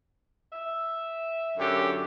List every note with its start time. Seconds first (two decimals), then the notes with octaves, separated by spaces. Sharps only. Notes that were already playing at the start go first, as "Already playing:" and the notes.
0.53 E5
1.58 F#2 D3 G4